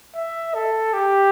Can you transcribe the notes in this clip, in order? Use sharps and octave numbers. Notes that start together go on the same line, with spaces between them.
E5
A4
G4